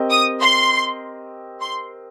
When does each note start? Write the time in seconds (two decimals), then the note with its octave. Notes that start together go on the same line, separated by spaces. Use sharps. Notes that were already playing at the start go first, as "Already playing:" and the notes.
Already playing: C4 G4 A#4 D#5
0.10 D#6
0.40 C6
1.60 C6